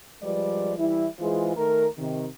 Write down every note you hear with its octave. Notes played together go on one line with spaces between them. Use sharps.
F3 G3 G#3 B4 D5
E3 G3 E4
E3 G#3 F4 G#4 C5
D#3 A3 A#4
C3 D#3